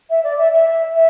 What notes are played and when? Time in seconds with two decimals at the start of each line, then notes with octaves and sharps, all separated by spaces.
0.10 E5
0.24 D5
0.38 E5
0.53 E5
0.95 E5